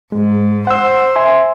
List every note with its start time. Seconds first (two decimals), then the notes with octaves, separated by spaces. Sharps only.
0.12 G#2 G#3
0.67 C5 F#5 E6
1.16 E5 G#5 C6